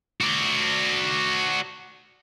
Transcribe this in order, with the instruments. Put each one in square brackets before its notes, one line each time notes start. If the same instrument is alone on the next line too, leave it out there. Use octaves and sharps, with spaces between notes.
[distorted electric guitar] F#4 D5